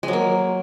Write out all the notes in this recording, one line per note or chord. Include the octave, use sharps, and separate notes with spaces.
G#3
F#3
A#3